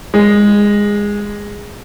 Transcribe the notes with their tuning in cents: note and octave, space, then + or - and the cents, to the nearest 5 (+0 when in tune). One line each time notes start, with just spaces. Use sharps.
G#3 -15